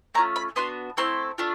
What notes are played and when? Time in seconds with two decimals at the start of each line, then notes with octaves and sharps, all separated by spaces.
0.14 A3 C#4 F4 A#5
0.36 B5
0.56 B3 D4 F#4 C6
0.97 A3 C4 E4 A4 C6
1.38 A3 D4 F4